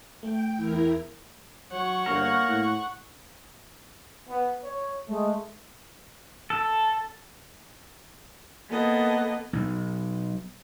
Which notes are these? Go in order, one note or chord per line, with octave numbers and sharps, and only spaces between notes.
A3 G5
E2 E4 A#4
F#3 C#5 F#5 C#6
G1 A#3 A#4
A2
B3
C#5
G#3 A3
A4
A#3 B3 A4 D#5
B1